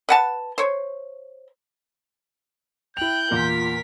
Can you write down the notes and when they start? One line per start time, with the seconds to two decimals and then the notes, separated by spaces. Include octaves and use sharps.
0.09 B4 F#5 A5
0.58 C5 C#5
2.97 E4 G5 F#6 G6 F7
3.31 E2 A#2 A#3 F4 A#4 B6